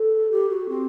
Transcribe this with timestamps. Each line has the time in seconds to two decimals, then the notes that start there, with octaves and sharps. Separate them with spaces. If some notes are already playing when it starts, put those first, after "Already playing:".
Already playing: A4
0.31 G4
0.50 F#4
0.69 C4